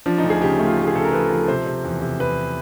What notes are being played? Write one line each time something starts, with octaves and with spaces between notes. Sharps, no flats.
F3 D4
D#4
D2
G#4
C#3 G4
A3
F4
A3 G4
G#4
C#3 A4
A#4
F3 B4
F3
C3 C5
C3
E2
C3
E2 B4